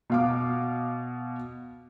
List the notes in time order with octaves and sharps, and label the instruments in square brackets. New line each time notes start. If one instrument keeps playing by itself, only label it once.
[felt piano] B2 F5 D6